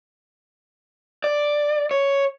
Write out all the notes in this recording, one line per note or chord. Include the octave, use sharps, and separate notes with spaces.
D5
C#5